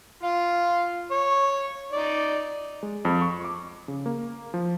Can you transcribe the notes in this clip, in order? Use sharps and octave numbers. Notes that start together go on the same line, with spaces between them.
F4 F5
C#5
D#4 D5
G#3
F2
C#6
D6
C#3
A#3
F3